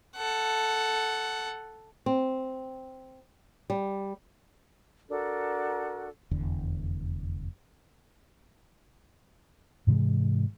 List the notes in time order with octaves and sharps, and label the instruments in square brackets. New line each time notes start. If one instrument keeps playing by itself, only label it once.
[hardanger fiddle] A4 F#5
[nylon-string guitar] C4
G3
[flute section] D4 F#4 A4 A#4
[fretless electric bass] F1 E2 D3
[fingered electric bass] G#2 C3 E3 G#3